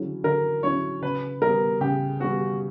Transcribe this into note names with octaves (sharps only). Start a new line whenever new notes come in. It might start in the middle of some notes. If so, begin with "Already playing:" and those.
Already playing: D3 F#3 C#4 E4
D3 A#4
F#3 C#4 E4 C#5
C#3 B4
G3 B3 A#4
C#3 G4
G3 B3 F#4